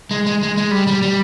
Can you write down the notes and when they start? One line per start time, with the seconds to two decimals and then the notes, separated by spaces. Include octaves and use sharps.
0.11 G#3
0.26 G#3
0.43 G#3
0.57 G#3
0.71 G3
0.87 G3
1.02 G3